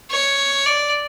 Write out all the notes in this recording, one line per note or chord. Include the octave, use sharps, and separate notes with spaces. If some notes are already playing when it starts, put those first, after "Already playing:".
C#5
D5